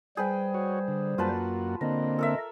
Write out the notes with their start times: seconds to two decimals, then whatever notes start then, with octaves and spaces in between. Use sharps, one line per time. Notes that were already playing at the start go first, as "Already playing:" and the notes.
0.17 G3 G#4 B4 C5 G5
0.54 F#4 C#5
0.88 D3
1.18 F#2 A#3 F4 F#4 B4 A5
1.81 D3 A#3 C4 D#5
2.19 A4 A#4 E5